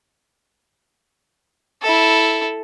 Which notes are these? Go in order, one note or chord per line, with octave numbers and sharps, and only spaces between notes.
E4 A4